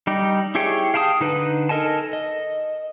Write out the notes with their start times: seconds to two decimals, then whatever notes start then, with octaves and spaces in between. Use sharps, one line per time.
0.07 G3 D#4 G4
0.55 E4 G4 G#4 C#5 G5
0.94 F5 G5 A5 A#5 D#6
1.20 D3 D#4 B4
1.69 A4 A#4 D#5 G#5 A5
2.13 D#5